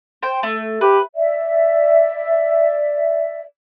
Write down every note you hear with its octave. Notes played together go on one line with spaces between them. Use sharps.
C5 G5
A3
G4 B4
D5 E5